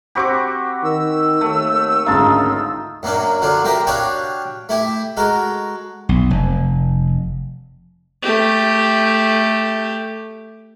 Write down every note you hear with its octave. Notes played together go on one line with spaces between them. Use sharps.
C4 F#4 G4 B5 C#6 D6
D#3 E6
D#2 A3
G#1 D2 C#3 D#4 F4 F5 A5
F#2 F#3 A#3 C#4 D4
D3 F3 F#3 D4 F4
A#3 C4 G4 A#4 E5 G5
D4 F#4 G4 C#5 F5 G5
A3 E4 G4
G#3 F#4 A4 A#4
B1
F1
A3 G4